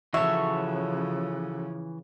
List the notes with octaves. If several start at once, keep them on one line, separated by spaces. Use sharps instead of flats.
C#3 E3 F3 F#4 A4 C#5 E5